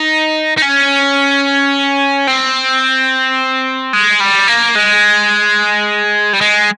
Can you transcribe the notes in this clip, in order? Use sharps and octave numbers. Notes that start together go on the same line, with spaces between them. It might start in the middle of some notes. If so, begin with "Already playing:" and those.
Already playing: D#4
D#4
C#4
C4
G#3
G3
A#3
G#3
G3
G#3